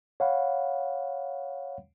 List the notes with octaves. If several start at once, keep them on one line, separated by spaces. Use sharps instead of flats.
C#5 F5 F#5 B5